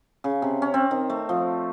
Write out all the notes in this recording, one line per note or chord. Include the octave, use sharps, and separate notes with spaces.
C#3
C3
C#4
C4
D#3
A3
F3